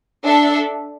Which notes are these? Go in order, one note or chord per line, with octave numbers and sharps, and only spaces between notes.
D4 A4 E5